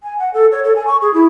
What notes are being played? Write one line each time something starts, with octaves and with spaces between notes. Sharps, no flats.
G#5
F#5
A4
C#5
A4
G#5
C#6
G#4
E4